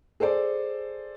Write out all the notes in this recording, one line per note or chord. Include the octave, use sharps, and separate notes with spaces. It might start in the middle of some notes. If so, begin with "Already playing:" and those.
G#4 A4 C5 D5